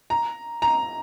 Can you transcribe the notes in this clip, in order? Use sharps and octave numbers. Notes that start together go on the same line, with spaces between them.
A#5
A#5